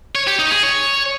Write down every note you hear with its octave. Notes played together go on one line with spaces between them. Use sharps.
C#5
G4
D#4
G#4
C#5